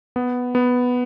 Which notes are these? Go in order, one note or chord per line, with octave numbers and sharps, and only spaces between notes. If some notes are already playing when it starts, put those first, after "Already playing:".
B3
B3